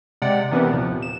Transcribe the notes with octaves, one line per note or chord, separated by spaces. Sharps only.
C3 G#3 D5 F#5 G5
C3 E3 B3 C4 A#4 B4
D#2 A#2 F3
E7